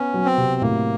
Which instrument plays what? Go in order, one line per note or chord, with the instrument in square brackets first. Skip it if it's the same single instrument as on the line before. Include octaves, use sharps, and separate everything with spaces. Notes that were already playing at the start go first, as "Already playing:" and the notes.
Already playing: [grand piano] B3 [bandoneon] C#4
[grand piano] F#3
[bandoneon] C4
[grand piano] C3
[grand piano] A2 [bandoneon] A#3